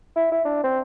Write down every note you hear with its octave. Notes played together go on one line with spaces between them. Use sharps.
E4
E4
D4
C4